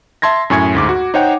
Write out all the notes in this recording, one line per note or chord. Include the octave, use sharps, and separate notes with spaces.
E5 A5 C6 G#6 A#6
F#2 A2 G#5 C#6 G#6
D2 G#2 D6
F#4
D#4 C5 C#5 F#5 G5